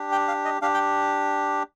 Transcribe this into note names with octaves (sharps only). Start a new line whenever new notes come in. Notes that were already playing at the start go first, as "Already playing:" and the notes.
Already playing: D4 G4
G5
F5
D#5
D4 G4 F5
G5